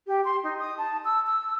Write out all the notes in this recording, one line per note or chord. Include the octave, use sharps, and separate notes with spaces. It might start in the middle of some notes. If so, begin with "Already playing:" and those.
G4
C6
D#4
D#6
A5
E6
E6